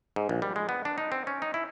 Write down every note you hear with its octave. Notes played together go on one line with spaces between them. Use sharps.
G#2
A#1
G3
G#3
B3
D4
D#4
C4
C#4
D#4
E4